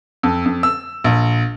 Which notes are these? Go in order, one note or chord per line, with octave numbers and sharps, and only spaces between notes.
F2
F2
E6
A#1